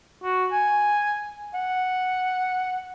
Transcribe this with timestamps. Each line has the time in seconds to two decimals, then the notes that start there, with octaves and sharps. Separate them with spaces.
0.24 F#4
0.52 G#5
1.54 F#5